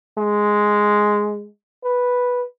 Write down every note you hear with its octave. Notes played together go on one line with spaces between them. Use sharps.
G#3
B4